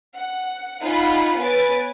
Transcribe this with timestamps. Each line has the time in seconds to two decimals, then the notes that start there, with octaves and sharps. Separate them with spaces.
0.15 F#5
0.84 D#4 F4 F#5 G#5 B5
1.40 B3 B4 C#5 G#5 A6 D7